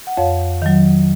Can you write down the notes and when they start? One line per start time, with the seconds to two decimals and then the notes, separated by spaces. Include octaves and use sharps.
0.07 F#5
0.17 F2 C#5 F5
0.62 D#3 F#3